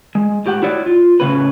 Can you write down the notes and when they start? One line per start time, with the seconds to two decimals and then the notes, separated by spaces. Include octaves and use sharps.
0.15 G#3
0.46 A2 G4 F#5
0.63 E4 F#4 C#5 D5
0.86 F4
1.20 A2 C#3 C#4 B4